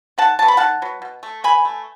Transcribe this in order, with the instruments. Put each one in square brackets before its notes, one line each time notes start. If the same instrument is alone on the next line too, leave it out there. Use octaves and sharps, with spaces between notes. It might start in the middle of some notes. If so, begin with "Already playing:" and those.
[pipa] D#3 F#5 A5
F#3 B3 A5
B5
D#3 F#5 A5
F#3 B3
B2
A3
B2 G#5 B5
A3